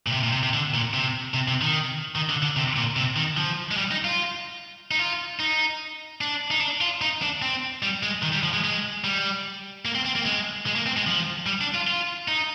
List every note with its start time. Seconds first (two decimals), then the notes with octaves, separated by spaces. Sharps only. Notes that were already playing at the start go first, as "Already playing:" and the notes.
0.07 A#2
0.12 C3
0.23 A#2
0.33 C3
0.43 C3
0.54 D3
0.74 A#2
0.93 C3
1.34 C3
1.48 C3
1.61 D#3
2.16 D#3
2.29 D3
2.42 D3
2.56 C3
2.76 A#2
2.96 C3
3.16 D#3
3.37 F3
3.71 G#3
3.77 G3
3.91 D#4
4.05 F4
4.91 D#4
4.99 F4
5.40 D#4
6.21 D4
6.51 D#4
6.61 D4
6.81 F4
7.02 D#4
7.22 D4
7.42 C4
7.83 G3
8.03 G#3
8.22 D#3
8.33 G3
8.43 F3
8.54 G#3
8.64 G#3
9.04 G3
9.85 A#3
9.95 C4
10.05 C4
10.16 A#3
10.26 G#3
10.66 G#3
10.76 A#3
10.86 C4
10.97 G#3
11.07 F3
11.46 G3
11.61 D4
11.74 F4
11.87 F4
12.28 D#4